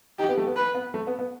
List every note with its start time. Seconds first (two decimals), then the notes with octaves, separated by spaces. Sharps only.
0.19 D#4 G4
0.29 B3
0.38 A3
0.47 B3
0.56 B4
0.75 B3
0.94 A3
1.07 B3
1.19 B3